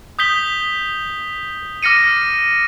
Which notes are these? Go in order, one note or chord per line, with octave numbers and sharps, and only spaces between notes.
D#6 G6 B6 G7
D6 F6 A#6 C#7 D#7